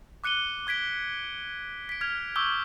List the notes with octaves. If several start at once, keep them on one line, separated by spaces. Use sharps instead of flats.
D6 F#6 C#7 D#7 G7
D6 G#6 B6 D7 G7
B6 D7
F6 G#6 F7
C#6 D6 E6 G6 G7